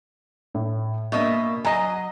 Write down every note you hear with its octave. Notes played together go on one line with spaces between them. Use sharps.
A2
B2 A#3 D4 D#5 E5
F#3 D#5 G#5 A#5 A#6